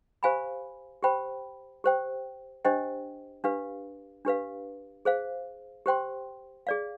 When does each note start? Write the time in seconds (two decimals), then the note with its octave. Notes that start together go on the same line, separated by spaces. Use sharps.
0.23 G4 C5 F5 G#5 B5
1.03 G4 C5 G5 B5
1.84 G4 C5 G5
2.65 D4 G4 C5 D#5 G5
3.44 D4 G4 B4 F5
4.25 D4 G4 B4 F5
5.05 G#4 C5 F5
5.86 G4 C5 G5 C6
6.67 G#4 D5 F5